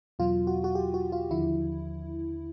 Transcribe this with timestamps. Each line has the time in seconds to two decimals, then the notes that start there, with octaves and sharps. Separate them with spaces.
0.19 E2 B2 F#3 F4
0.47 F#4
0.64 F#4
0.75 G4
0.94 F#4
1.12 F4
1.31 D#2 D3 F3 E4